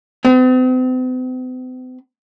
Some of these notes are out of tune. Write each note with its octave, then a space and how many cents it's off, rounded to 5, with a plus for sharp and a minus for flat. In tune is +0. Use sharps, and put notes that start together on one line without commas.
C4 -45